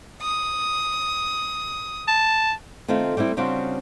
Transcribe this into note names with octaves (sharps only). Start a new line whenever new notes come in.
D#6
A5
D#3 A3 C4 F4
G3 A3 C4 E4
C#3 G3 C4 D4 F4 F#4